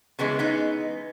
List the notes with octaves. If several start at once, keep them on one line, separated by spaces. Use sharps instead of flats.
C#3 E3 G#3 B3
B3 D#4